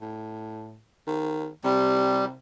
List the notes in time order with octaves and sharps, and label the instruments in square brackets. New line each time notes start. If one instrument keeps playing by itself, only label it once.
[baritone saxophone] A2
D#3
[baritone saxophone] C3 [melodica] G3